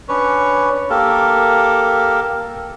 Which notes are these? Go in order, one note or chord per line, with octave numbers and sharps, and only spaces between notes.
C#4 D4 B4 C#5 C#6
A#3 G4 A4 A#4